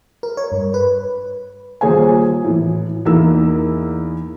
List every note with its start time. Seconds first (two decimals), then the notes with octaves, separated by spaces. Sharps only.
0.23 A#4
0.37 C#5
0.52 G2
0.74 B4
1.81 D#1 A#3 G#4 C5 C#5 G#5
2.45 A2 E3
3.05 E2 A#3 D#4 E4 A#4 E6